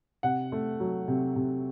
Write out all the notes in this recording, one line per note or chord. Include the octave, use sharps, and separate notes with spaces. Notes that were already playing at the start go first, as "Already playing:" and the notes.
C3 F#5
A3
F#3
C3
C3